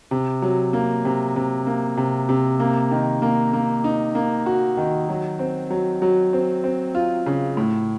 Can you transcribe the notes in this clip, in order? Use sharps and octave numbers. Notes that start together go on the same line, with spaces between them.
C3
F#3
A#3
C3
C3
A#3
C3
C3
A#3
D#3
A#3
A#3
D#4
A#3
F#4
D#3
F#3
C4
F#3
F#3
C4
C4
F4
C#3
A2